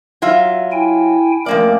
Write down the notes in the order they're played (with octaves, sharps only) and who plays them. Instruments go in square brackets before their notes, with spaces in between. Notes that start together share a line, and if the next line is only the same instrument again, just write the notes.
[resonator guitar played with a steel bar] F#3 F4 E5
[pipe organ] E4 G5 G#5
[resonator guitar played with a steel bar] F2 A#3 D5 [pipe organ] A3 C#4 A#4